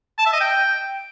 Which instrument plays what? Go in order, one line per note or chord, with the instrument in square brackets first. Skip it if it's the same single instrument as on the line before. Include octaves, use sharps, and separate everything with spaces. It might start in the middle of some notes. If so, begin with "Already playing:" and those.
[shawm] A5
E5
D#5
G5